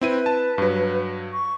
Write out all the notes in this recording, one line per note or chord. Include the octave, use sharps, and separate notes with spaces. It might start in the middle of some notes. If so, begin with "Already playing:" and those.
C4 E4 B4 D#7
A5
G2 F#3
C#6